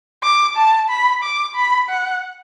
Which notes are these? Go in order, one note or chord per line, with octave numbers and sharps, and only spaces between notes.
D6
A5
B5
D6
B5
F#5